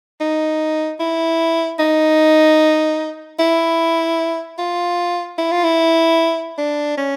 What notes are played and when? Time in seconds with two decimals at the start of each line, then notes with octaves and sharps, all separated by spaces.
0.20 D#4
1.00 E4
1.79 D#4
3.39 E4
4.58 F4
5.38 E4
5.51 F4
5.64 E4
6.58 D4
6.98 C#4